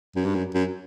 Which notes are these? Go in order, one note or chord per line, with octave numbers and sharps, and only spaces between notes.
F#2
G2
F#2
F#2